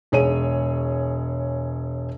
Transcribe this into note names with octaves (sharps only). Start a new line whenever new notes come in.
E1 G#4 C#5 D#7